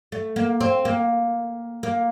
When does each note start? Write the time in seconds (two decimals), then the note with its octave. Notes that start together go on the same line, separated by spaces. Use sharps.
0.12 A3
0.36 A#3
0.61 C4
0.85 A#3
1.83 A#3